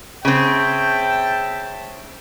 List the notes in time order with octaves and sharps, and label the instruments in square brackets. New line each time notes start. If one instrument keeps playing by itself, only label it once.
[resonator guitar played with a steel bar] C#3 C4 [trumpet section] E5 G5 A5